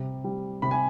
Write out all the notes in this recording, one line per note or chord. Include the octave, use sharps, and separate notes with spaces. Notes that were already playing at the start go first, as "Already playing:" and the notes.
Already playing: C3 G3
G3
C3 B5
G#5